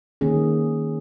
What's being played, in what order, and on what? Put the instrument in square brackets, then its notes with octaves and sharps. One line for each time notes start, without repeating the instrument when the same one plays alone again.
[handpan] D#3 A#3 C#4 G#4